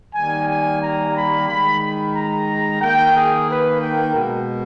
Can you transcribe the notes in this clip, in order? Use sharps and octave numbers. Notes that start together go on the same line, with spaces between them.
D#3 G3 A#3 G#5
G#5
A#5
B5
D#3 G#3 B5
B5
A#5
D#3 A#3 G5
G#4
B4
G5
B2 G#3